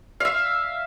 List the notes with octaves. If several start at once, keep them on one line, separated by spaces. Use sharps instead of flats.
E5 F5